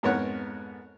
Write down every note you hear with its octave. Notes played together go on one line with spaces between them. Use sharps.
F2 G#2 B3 A#4 C#5 F#5